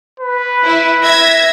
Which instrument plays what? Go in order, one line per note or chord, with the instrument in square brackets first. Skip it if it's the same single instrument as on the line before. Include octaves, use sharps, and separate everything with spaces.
[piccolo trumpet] B4
[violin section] E4
E5 G#6 A#6